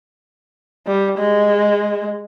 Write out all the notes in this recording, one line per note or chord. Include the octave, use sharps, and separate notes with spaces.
G3
G#3